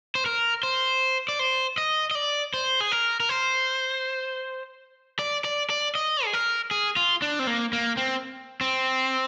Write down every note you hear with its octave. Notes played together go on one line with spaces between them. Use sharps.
C5
A#4
C5
D5
C5
D#5
D#5
D5
C5
G#4
A#4
A#4
C5
D5
D5
D5
D#5
G#4
A#4
G#4
F4
D4
C4
A#3
A#3
C4
C4